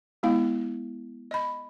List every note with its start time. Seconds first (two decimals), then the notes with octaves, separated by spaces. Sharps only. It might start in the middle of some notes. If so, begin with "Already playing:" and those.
0.23 G#3 B3 E4 F5
1.31 D#5 B5